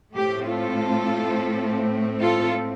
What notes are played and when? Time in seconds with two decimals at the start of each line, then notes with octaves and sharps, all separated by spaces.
0.14 A2 A3 C4 G4
0.48 F4 A4
2.21 F4 A4